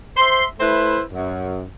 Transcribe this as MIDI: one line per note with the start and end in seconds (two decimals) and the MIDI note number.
0.17 0.45 72
0.17 0.45 76
0.17 0.45 84
0.60 1.01 57
0.60 1.01 64
0.60 1.01 71
0.60 1.01 72
1.12 1.66 42